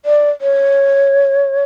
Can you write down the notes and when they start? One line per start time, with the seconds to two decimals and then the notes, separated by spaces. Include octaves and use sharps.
0.05 D5
0.41 C#5